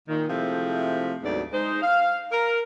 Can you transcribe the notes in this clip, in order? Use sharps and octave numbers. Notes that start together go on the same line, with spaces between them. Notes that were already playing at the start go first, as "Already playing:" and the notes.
A#2 D#3
C3 F3 G#3 A3 C4 E4
D2 G#2 C3 F#3 B3 D5
G#3 D#4 C5
F5
A#4